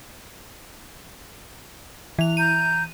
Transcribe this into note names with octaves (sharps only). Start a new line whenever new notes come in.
E3 F7
A#5 G6 D#7